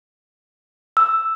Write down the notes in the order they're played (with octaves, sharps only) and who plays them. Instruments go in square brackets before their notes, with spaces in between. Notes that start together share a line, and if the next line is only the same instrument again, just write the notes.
[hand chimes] E6